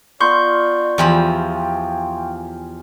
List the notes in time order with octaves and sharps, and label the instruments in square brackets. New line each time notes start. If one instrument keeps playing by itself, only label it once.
[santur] B3 F4 A#4 [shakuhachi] D5 [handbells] C6 C#6 G6
[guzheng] E2 F3 B5 [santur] F4 G4 G#5
[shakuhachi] G5